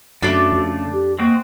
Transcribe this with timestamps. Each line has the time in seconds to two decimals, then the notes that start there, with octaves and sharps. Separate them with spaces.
0.22 F#2 C#3 A3 D4 F#4 A4 D5
0.52 F2
0.93 G4
1.19 G#3 A#3 C4 F#4